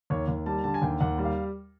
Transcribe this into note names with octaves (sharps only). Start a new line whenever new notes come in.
D#2 C#5
D#2
G3 A5
D3 A5
G#5
D#2 G5
D#2 F#5
G3
F5